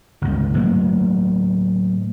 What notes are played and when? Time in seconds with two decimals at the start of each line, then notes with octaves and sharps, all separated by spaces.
0.22 G1 C#2
0.56 A2 F#3 A#3